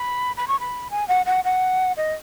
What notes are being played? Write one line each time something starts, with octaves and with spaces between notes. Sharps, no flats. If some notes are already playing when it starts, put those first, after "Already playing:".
Already playing: B5
B5
C#6
B5
G#5
F#5
F#5
F#5
D#5